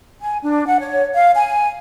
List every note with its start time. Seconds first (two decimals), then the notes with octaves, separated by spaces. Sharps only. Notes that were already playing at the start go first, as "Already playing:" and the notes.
0.20 G#5
0.42 D4
0.67 F#5
0.80 C#5
1.14 F5
1.36 G#5